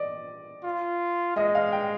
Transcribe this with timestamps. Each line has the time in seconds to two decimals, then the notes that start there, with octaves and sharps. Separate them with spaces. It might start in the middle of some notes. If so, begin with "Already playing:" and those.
Already playing: D5 D#5
0.64 F4
1.36 G#3 D#5
1.55 F5
1.72 G5